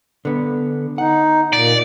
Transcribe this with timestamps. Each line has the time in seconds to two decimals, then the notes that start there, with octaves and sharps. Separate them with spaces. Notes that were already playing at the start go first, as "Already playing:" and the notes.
0.25 D3 B3
0.98 D#4 F#5
1.53 A#2 D5